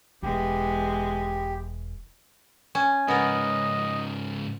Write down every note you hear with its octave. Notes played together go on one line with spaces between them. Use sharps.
E1 E3 G#3 B3 G4
C#4
G#2 C#3 B3 A#4 D#5